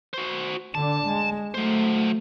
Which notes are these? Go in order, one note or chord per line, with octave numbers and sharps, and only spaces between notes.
F#4 C5
D3 D4 A5
G#3
F#3 A3 C5